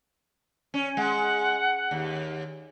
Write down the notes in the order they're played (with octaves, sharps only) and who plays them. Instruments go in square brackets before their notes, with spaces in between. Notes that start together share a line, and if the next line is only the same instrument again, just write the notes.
[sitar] C#4
[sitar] G#3 [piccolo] F#5
[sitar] D#2